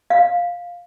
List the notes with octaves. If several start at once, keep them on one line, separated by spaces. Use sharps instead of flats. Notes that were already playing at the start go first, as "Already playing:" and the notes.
F5